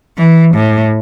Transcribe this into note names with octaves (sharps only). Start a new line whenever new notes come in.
E3
A2